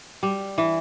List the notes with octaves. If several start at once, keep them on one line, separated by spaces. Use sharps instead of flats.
G3
E3